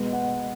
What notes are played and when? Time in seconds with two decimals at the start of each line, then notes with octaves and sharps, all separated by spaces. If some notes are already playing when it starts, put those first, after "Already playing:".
Already playing: B2 G#3 B3
0.13 F#5